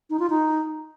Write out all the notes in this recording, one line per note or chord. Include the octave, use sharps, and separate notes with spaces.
D#4
F4
D#4